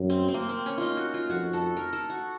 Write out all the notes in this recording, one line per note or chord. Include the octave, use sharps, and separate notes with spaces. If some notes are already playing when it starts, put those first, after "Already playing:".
Already playing: F#2
C4
C4
A#3
C4
C#4
D#4 F4
F#4
F4
F2 F#4
A4
A#4
A4
F#4